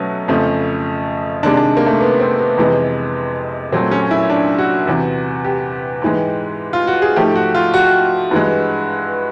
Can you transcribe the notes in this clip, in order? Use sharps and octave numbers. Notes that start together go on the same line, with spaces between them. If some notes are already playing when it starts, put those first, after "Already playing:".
Already playing: B2 F#3 A3 C#4
F2 C#3 F3 A3
C3 D#3 G#3 D4
D4
A#3
A3
B3
C4
B3
F2 C3 E3 G#3
A#2 F#3 A3 C4
C#4
E4
D4
F#4
E2 C3 E3
G4
G#2 E3 G#3
F4
F#4
G#4
G#2 F3 A3 G4
F#4
F4
F#4
G2 E3 G#3